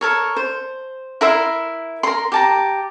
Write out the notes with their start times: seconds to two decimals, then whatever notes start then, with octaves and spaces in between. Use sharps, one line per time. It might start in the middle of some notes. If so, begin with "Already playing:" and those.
0.01 A4 A#4 C#5
0.36 C5
1.21 E4 A#4 E5 C6
2.03 A#4 C6
2.32 G4 A5 A#5